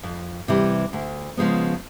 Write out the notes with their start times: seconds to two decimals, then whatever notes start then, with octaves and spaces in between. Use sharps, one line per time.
0.03 F2
0.48 C3 E3 G3
0.93 D2
1.37 C#3 F3 G#3 B3